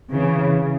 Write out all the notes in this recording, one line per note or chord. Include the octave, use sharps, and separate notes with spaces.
C#3 E3